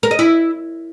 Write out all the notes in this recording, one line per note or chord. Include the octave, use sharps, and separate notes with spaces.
A#4
D#5
E4